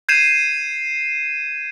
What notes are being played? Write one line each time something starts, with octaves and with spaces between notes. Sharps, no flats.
G6 G#6 C7 D#7 E7